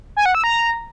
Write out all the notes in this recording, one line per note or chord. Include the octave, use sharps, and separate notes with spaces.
G#5
F#5
E6
A#5